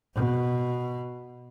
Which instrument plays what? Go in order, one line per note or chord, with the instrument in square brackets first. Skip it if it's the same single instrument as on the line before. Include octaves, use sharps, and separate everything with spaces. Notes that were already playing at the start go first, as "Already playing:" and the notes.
[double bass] B2